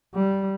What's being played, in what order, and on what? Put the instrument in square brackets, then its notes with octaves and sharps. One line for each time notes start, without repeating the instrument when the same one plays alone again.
[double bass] G3